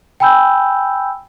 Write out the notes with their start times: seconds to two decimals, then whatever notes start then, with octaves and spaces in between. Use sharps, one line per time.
0.20 G5 G#5 B5 E6 G6